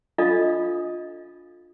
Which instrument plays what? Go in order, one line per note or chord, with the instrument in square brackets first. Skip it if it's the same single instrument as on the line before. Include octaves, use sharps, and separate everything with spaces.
[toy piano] D4 F4 A4 D#5 F5 D#6